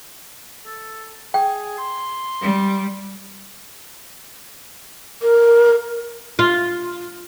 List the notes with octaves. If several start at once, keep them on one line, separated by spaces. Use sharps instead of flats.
A4
G#4 G5
C6
G3
A#4
F4